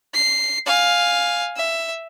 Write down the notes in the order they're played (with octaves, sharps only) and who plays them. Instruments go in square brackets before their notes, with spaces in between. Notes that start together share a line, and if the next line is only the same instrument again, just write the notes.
[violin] C7
F5 G#5
E5